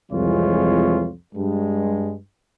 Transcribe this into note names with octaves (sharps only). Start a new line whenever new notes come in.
C2 F2 E3 G#3 F4 C#5
G2 G#3